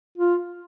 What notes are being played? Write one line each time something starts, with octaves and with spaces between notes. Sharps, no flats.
F4